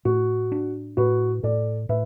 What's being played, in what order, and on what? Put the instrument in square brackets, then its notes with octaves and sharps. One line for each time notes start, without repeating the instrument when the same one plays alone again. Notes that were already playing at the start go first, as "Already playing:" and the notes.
[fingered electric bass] A2 [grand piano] F#4
[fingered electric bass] D4
[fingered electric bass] A2 [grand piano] F#4 B4
[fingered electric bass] A2 [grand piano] A4 D5
[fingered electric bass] A2 [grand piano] B4 E5